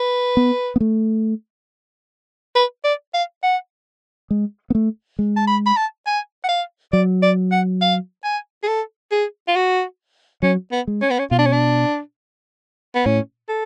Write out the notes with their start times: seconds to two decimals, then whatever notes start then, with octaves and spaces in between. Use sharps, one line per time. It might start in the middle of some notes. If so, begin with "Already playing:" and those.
Already playing: B4
0.37 B3
0.76 B3
0.80 A3
2.55 B4
2.84 D5
3.14 F5
3.43 F#5
4.31 G#3
4.70 B3
4.75 A3
5.19 G#3
5.36 A5
5.47 B5
5.66 B5
5.77 A5
6.06 G#5
6.44 F#5
6.49 F5
6.92 F#3 D5
7.22 D5
7.52 F#5
7.81 F5
8.24 G#5
8.63 G#4
8.68 A4
9.12 G#4
9.48 F4
9.56 F#4
10.43 F#3 C#4
10.72 B3
10.87 G#3
11.02 C#4
11.10 B3
11.19 C#4
11.31 B2 F4
11.39 D4
11.46 C#4
11.53 D4
12.95 B3
13.05 A2 C#4
13.49 A4